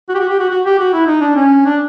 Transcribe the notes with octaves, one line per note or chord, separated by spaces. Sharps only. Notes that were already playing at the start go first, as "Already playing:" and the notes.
F#4
G4
F#4
G4
F#4
F#4
G4
F#4
E4
D#4
D4
C#4
D4